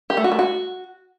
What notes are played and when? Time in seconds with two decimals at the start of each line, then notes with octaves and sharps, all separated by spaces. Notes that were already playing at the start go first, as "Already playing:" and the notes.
0.10 G4
0.17 A3
0.24 F#4
0.32 A3
0.39 F#4